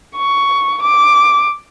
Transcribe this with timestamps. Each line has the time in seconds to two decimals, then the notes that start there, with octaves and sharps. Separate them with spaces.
0.16 C#6
0.82 D6